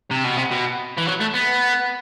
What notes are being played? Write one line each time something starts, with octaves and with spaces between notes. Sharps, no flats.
C3
B2
C3
B2
E3
F#3
A3
B3